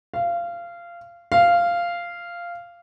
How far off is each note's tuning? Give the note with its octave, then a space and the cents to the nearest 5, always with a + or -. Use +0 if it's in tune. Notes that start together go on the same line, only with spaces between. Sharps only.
F5 -20
F5 -10